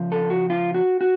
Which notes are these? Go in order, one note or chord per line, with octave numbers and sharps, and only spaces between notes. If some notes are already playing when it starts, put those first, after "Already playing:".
Already playing: C#3 F3
A4
F#4
F4
F#4
F#4